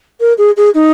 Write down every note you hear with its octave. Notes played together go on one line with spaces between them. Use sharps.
A#4
G#4
G#4
D#4